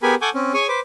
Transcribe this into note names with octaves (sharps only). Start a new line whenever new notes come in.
B3 G4 G#4 A#4 G#5 B5
A4 F#5 G#5 C#6 D6 G6
C4 C#4
G#4 C#5 G#5 C#6
B4 C5 D6